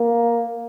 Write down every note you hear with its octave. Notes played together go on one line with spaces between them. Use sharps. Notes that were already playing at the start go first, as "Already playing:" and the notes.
Already playing: A#3